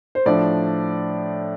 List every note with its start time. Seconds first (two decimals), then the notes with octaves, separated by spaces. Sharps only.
0.15 C5
0.26 A2 F3 D4 D5